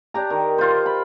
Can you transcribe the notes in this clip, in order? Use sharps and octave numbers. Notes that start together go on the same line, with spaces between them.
D4 G4 A#5
D#3
F4 C5
B5